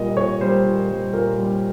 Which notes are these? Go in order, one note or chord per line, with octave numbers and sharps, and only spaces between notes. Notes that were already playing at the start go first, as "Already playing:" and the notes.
Already playing: A#2 G3 A#3 D#5
A#2 C#5
G3 A#3 C5
A#2
G3 A#3
A#2 A#4
G3 A#3